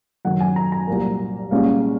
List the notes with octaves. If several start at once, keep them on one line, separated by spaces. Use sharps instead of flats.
F#2 D#3 F#3 F#5
G#5
A#5
A#5
C2 A#2 F#3 A#3
C2 A#2 G#3 C#4 F5